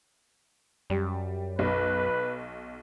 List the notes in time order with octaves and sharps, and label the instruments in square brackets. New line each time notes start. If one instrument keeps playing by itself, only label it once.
[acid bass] F#2 [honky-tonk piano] G3
[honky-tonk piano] B1 [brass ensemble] B4